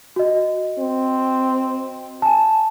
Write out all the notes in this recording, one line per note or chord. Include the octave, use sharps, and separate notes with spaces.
F#4 D#5
C4
G#5 A5